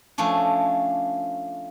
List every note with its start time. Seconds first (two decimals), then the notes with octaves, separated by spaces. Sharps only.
0.18 F3 A3 C#4 D4